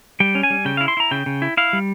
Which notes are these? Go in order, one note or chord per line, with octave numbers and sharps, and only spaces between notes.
G3 G5
C#4
G#5
G3
C#3 G5
E4 F5
C6
E4 A#5
C#3 G5
C#3
E4
E4 F5
G3